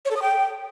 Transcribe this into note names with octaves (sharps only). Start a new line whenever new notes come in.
C#5
A4
D#6
G5